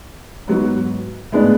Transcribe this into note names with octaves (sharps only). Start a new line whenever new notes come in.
G#2 F#3 B3
A2 G#3 B3 D4